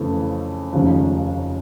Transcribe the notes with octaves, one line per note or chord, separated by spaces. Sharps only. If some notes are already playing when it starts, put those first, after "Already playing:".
Already playing: F2 C#3 E3 A3
F1 D#2 C#3 F3